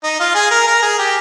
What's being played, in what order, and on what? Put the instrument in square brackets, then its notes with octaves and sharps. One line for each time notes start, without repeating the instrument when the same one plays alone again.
[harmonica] D#4
F4
G#4
A#4
A#4
G#4
G4